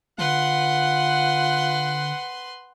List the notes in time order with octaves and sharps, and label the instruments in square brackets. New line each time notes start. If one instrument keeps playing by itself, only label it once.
[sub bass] D3 [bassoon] F4 [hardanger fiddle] B4 C6 [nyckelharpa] F#5